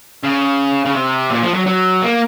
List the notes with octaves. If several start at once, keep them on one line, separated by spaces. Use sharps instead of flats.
C#3
C#3
C3
A#2
F3
F#3
F#3
A#3